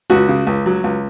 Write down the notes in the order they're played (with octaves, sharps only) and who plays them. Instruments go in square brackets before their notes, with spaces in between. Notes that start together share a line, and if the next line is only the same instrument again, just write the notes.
[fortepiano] C#2 F#4
C#3
C#2
F#3
C#2